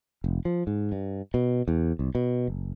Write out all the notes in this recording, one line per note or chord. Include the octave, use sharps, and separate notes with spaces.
F1
F3
G#2
G2
B2
E2
C2
B2
F#1